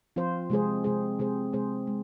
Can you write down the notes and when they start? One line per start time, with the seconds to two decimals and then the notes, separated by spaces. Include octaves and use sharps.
0.16 F3 C4 F4 C5
0.50 C3 G#3 C4 G#4 C5
0.84 C3 G#3 C4 G#4 C5
1.19 C3 G#3 C4 G#4 C5
1.53 C3 G#3 C4 G#4 C5
1.87 G#3